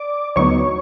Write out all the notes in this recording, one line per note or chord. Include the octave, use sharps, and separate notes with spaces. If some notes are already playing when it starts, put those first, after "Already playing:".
Already playing: D5 D6
D2 D3 F#3 B3 D#4 C#5 C#6